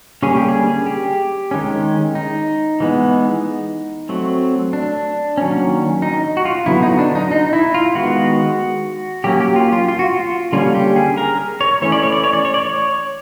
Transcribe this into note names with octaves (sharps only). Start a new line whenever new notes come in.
D3 G3 A#3 C#4 G#4
G4
G#4
G4
D#3 G#3 C#4
D#4
E3 G#3 B3
F#3 A3 C4
D4
D#3 F#3 A#3 C#4
D#4
F#4
F4
D3 F#3 B3 E4
D#4
D4
D#4
D#4
E4
F4
D#3 G#3 B3 F#4
F#3 A#3 C#4 G4
G4
F4
F4
F4
F#4
F4
D3 G3 A#3 C#4 F4
G4
G#4
A#4
C#5
E3 A3 C#4 C#5
D5
C#5
D5
C#5
D5
C#5
D5
C#5